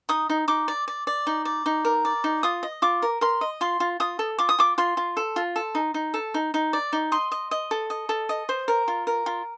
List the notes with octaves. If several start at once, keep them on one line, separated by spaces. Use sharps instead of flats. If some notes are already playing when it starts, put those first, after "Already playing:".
D#4 D#6
D#4
D#4 D6
D5
D5
D5
D#4
D5
D#4
A#4
D5
D#4
F4 D#6
D#5
F4 D6
A#4
A#4 C6
D#5
F4 C6
F4
F4 D#6
A4
F4 D6
D#6
F4 D6
F4 C6
F4
A4
F4
A4
D#4
D#4
A4
D#4
D#4
D5
D#4
D#5 C6
D#5
D#5
A4
D#5
A4
D#5
C5
A#4
F4
A#4
F4